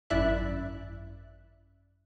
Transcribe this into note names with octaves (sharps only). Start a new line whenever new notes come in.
G#1 F#2 E4 D5 E5 F#6